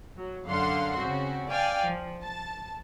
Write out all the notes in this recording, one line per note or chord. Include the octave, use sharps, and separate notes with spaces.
F#3
F#2 D3 F5 F#5 C6
C#3 C4 F#4
D5 F5 G5 G#5
F3
A5